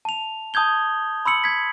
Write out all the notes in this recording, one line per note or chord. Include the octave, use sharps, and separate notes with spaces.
A5 F7
A5 D#6 G6 G#6 G7
B5 C6 E6 C#7 F#7
G#6 B6